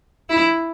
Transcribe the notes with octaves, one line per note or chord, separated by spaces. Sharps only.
E4